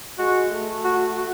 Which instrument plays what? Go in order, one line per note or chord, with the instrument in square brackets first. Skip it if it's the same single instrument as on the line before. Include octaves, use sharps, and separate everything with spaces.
[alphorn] G#3 [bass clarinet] F#4
[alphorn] A3
[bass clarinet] F#4
F#4